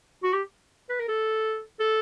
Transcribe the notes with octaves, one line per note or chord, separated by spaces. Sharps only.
F#4
G4
B4
A#4
A4
A4